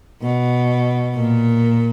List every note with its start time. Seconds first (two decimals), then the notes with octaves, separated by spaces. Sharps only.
0.22 B2
1.15 A#2